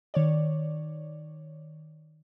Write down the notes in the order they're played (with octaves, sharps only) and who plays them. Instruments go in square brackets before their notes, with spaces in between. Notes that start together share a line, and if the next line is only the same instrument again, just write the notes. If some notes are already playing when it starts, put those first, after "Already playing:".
[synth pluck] D#3 C#5 D5